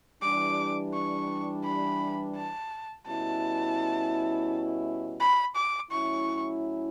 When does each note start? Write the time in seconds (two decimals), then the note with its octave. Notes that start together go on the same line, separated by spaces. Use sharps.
0.22 E3 G3 D4 D6
0.94 C#6
1.64 B5
2.36 A5
3.07 B2 G3 C#4 E4 A5
5.20 B5
5.55 D6
5.91 A2 F#3 C#4 E4 C#6